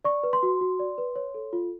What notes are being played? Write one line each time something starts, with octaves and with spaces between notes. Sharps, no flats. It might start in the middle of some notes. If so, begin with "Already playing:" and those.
D5 C#6
B4
C6
F#4
F#4
D5
B4
C#5
A4
F4